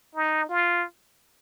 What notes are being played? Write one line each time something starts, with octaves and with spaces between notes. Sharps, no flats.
D#4
F4